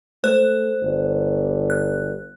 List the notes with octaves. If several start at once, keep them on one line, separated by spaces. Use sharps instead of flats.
A3 C5 F#6
G1
F#6